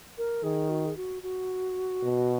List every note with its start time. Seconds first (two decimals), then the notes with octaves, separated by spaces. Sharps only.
0.18 A#4
0.43 D#3 G#4
0.70 F#4
0.85 G#4
0.97 F#4
1.23 F#4
2.03 B2